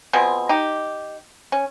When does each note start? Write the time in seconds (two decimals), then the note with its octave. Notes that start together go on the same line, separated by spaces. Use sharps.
0.13 B2 F3 C4 G#4
0.49 D#4 G4
1.52 C#4